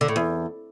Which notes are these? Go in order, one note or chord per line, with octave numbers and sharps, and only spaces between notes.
D3
A2
E2